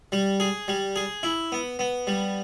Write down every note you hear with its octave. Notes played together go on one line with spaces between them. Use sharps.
G3
G#4
G3
G#4
E4
B3
B3
G3